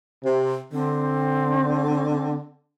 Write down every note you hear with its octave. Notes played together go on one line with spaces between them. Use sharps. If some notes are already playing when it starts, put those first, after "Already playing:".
C3
D3 C4